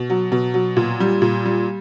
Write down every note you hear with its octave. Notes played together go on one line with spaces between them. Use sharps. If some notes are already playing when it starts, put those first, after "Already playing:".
Already playing: B2
F#3
B2
F#3
A#2
G3
A#2
G3